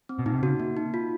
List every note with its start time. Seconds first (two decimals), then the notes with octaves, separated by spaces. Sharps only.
0.09 C4
0.19 B2
0.26 A#2 D#4
0.34 C3
0.43 C#3 F#4
0.60 A#3
0.77 D#4
0.94 F4